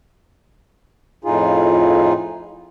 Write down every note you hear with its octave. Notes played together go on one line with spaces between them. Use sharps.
F2 A2 D#4 F4 G#4